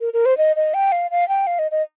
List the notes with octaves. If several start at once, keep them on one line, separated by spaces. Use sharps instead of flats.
A#4
A#4
C5
D#5
D#5
G5
F5
F5
G5
F5
D#5
D#5